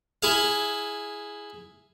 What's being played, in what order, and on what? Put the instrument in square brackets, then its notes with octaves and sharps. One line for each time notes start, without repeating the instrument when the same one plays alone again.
[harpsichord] E4 G#4 F5